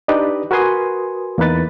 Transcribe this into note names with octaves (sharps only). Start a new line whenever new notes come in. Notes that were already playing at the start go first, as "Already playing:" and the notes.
D4 D#4 G4 B4 D5 D#5
F#4 A#4 B4 G#5 C6 D#6
E2 A#3 D#4 B4 A6